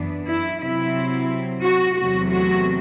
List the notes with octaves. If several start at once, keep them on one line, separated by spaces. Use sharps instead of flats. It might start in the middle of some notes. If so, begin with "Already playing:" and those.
Already playing: F#2 E3 B3 D4
E4
C3 F#3 C4 E4
F#4
E2 C3 F#3 A3 F#4
F#4